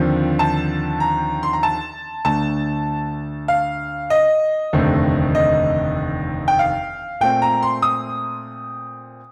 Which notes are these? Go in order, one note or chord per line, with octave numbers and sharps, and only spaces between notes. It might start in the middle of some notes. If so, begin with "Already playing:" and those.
Already playing: D#2 D3 F3 C4
A5
A#5
C6
A#5
A5
D2 D3 A3 D4 A5
F5
D#5
F1 D#2 D3 A3 C4
D#5
G5
F5
A#2 A3 C4 G5
A#5
C6
D#6